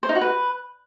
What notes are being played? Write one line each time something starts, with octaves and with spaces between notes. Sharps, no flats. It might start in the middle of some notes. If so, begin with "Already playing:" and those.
C5
D#4
F#4
B4